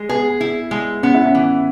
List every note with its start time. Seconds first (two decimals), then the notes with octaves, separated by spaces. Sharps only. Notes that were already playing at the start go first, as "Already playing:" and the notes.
Already playing: G#3
0.09 B3 G#4
0.41 E4
0.71 G#3
1.03 B3 C#4
1.14 E4
1.25 C#4
1.35 E3